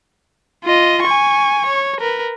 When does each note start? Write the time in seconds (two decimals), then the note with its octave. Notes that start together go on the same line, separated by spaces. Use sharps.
0.64 F4 D#5
1.03 G#5 C#6
1.66 C#5
2.01 A#4 B4